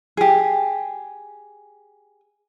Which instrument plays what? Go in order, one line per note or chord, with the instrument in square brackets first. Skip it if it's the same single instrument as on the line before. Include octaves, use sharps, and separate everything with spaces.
[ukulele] G4 G#4